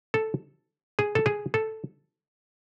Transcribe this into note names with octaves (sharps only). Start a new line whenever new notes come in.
A4
G#4
A4
G#4
A4